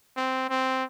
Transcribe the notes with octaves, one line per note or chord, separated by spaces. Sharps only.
C4
C4